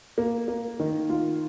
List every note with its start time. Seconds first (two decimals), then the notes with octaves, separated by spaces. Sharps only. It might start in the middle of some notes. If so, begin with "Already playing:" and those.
0.18 A#3
0.48 A#3
0.80 D#3
1.10 F4